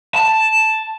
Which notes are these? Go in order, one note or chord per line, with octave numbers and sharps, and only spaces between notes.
A5